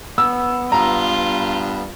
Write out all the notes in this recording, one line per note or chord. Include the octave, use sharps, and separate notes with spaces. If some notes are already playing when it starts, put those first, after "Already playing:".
B3 E6
G2 F4 A#5